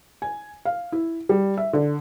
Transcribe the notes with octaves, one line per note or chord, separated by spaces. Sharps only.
G#5
F5
E4
G3
E5
D3